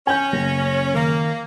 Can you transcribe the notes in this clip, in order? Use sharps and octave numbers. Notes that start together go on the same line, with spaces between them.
C#4 G#5 G6
F#1 A#6
D#3 A#3